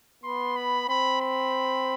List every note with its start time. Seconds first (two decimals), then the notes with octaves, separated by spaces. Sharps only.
0.24 B3 C6
0.56 B5
0.89 C4 B5
1.22 B5